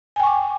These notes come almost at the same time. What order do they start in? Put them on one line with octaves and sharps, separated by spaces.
G#5 G5 C#6 D6